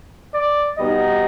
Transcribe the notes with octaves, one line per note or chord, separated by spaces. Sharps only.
D5
B2 G3 B3 D#4 D#5